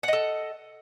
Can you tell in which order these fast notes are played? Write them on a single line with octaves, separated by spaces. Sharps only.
F#5 D#5 A4